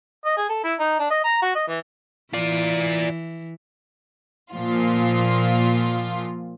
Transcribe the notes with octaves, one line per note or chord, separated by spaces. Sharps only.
D#5
G#4
A4
E4
D#4
D4
D#5
A#5
F#4
D#5
E3
E3 F4 D5
A#2 F3 F4